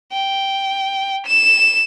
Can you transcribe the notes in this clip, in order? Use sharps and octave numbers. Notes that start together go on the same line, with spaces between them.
G5
E7